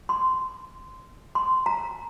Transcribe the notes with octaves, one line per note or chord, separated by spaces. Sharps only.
C6
C6
A#5